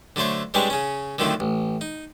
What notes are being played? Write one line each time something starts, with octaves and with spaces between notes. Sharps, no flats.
D3 F#3 A3 C5 C#5
G3 G#3 B3 C4 D4 C#5
C#3 C#4
D3 D#3 F3 F#3 A3 C4
A1
D#4